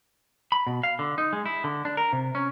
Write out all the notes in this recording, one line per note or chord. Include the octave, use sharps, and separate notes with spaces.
B5
B2
F5
D3
D#4
G#3
E4
D3
D4
A#4
C3
C#4